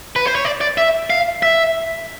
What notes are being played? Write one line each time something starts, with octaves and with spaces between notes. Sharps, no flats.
B4
C5
C#5
D5
D5
E5
F5
E5